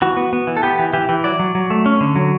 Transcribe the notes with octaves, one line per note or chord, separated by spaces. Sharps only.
E3 F#4
B3
B3
E3
A4
B3 G4
E3
E3 G4
E3
F#3 D5
F#3
F#3
A3
C#4
D3
F#3